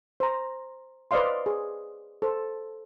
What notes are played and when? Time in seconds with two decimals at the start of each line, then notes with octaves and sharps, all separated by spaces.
0.20 C5 A#5
1.11 B4 C5 D5 D#5 F5 C6
1.46 G#4
2.22 A4 C5